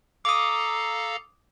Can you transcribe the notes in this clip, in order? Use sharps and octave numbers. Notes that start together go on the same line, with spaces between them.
A4 F5 A#5 D6 D#6